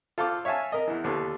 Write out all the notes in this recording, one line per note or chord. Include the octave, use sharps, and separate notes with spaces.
F4 A4 C5 F5 D6
C#5 E5 F5 G#5 A5
A#4 D#5
E2 E3
D#2 D3 B3